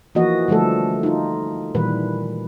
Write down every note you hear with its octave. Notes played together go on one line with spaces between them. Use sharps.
E3 F3 A#3 F#4 D#5
D3 F3 G3 A3 A4
D#4 F4
A#2 D#3 E3 G3 B4